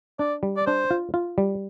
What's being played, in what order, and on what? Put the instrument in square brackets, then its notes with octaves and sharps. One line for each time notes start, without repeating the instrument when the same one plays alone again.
[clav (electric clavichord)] D4 [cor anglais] D5
[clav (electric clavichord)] G3
[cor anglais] D5
[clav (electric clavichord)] D4 [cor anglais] C5
[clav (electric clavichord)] F4
F4
G3